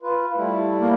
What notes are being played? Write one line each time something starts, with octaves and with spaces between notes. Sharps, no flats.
F4 B4
G3 A3 E4
A#3